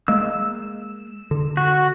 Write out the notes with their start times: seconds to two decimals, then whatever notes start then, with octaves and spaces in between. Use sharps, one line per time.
0.08 G#3 A#3 E6
1.31 D3
1.57 F#4